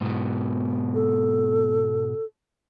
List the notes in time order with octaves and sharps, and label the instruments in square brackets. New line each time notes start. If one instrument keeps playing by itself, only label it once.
[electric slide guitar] G#2 B2 B3
[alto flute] A4